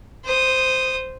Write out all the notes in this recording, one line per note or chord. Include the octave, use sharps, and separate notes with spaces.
C5 D#6